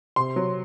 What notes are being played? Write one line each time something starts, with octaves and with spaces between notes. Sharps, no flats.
C3 C6
F#3